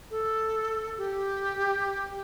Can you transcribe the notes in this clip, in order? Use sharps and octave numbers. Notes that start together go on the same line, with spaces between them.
A4
G4